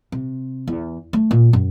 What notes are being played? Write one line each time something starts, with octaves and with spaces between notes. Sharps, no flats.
C3
E2
A3
A#2
F#2